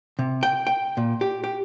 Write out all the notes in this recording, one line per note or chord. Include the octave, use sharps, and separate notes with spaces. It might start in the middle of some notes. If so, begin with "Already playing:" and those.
C3
G5
G5
A#2
G4
G4